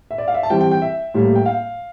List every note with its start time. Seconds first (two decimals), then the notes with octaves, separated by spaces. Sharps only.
0.11 E5
0.18 D5
0.28 F5
0.34 E5
0.43 A5
0.50 E3 G3 C4 G5
0.61 G5
0.71 G5
0.82 E5
1.14 A2 G3 A#3
1.35 G5
1.46 F5